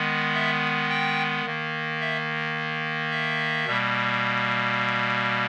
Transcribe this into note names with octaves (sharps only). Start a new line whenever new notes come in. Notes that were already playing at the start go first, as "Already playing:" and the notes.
Already playing: D#3 G#3 B3
E5
G5
D#3 A#3
E5
E5
B2 G3 A#3